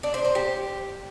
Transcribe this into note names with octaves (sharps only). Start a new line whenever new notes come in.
D4
C5
C5
G4